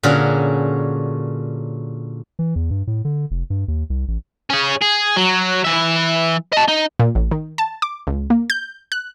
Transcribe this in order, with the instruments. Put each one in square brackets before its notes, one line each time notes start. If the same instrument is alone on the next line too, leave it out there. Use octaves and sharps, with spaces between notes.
[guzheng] A#2 D3 C#4 F#4 G#4 A#4
[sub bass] E3
E2
G2
A2
D3
F1
G2
D#2
C2
A1
[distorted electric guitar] C#4 G#4
G#4
F#3
E3 E5
D#5 A5
D#4
[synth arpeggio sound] A#2
A1
D#3
A5
D6
C#2
A#3
G6
F#6